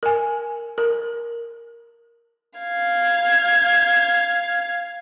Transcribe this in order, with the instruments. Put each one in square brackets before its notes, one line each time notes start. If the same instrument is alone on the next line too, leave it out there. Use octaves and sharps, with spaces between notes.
[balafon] A#4 G#5
A#4
[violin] F5 G#6